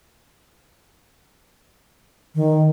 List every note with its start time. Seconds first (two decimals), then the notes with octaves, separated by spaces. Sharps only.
2.35 D#3